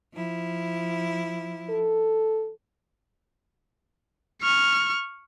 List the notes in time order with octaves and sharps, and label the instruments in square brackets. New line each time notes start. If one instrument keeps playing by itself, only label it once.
[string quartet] F3 E4
[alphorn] A4
[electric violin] C#6 F6